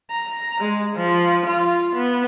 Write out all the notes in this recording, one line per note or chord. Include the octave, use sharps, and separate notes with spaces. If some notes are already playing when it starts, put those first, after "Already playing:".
A#5
G#3
F3
F4
B3